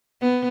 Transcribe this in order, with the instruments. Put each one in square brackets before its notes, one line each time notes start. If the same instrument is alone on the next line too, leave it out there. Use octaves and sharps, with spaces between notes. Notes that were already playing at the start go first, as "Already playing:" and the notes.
[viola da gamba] B3